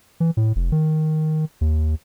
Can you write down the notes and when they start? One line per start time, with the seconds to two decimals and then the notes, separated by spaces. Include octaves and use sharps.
0.20 E3
0.37 A2
0.56 F1
0.72 D#3
1.61 D#2